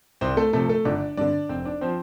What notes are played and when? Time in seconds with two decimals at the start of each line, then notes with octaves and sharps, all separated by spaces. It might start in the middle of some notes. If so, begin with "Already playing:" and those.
0.21 C2 C4 C5
0.37 A3 A4
0.53 C3 F3 A3 A4
0.69 A3 A4
0.85 G1 D4 D5
1.17 G2 D3 D4 D5
1.49 F1 C4 C5
1.65 D4 D5
1.81 F3 C4 C5